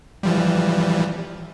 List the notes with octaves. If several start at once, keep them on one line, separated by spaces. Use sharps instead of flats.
E3 F3 G3